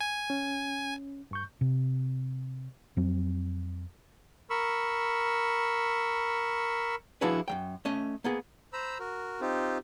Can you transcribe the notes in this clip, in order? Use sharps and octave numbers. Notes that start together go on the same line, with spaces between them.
G#5
C#4
G2 C#6 G6
C3
F2 F#3 C4
A#4 B5 C#6 E6
F3 D4 E4 F#4 G#4 B4
F#2 F#3 G5
A3 C#4 D#5
A#3 B3 G#4
C5 A#5 B5 E6
F#4 A#4
C4 D#4 F4 G4